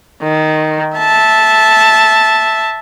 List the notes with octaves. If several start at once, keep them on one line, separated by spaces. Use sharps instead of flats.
D#3
E5 A5